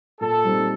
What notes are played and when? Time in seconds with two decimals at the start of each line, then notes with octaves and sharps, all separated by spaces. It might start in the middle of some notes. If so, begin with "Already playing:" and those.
0.21 A#2 A4
0.45 G3 C4 D#4